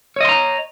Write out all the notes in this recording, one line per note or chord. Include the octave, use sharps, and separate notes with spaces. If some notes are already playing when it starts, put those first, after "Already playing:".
C#5 D#5 A#5 C6